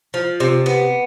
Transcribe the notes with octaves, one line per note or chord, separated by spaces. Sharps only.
F3
C3
B3